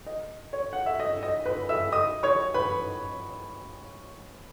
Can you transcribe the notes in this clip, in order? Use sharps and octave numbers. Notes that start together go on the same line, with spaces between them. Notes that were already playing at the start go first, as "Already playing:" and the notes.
D#5
C#5
F#5
E5
D#5
D#5
B4 B5
E5 E6
D#5 D#6
C#5 C#6
B4 B5